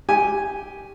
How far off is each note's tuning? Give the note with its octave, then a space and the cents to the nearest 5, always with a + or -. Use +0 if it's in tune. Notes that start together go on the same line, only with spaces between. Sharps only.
G4 +0 G#5 +0